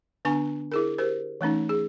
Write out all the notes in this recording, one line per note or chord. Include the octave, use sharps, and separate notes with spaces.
D3 B3 D4 G#5 C#6
E4 G#4 A#4
G4 A#4 C5
E3 A3 C#4 D#4
G#4